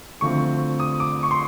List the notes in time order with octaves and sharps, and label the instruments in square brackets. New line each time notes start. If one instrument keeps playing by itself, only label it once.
[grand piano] D2 D3 F3 A3 C4 C#6
D#6
D6
C#6
C6